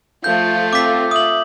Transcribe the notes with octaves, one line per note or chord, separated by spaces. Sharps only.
F3 A3 F4 G6
C4 D6 B6
E5 D#6 F#7